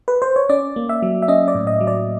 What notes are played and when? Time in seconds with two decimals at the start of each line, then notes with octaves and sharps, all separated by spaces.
0.08 B4
0.22 C5
0.36 C#5
0.49 C#4 D5
0.76 A#3
0.89 E5
1.03 F#3
1.22 E5
1.28 C#4 D#5
1.48 D5
1.55 A2
1.67 D#5
1.81 F#3
1.87 D5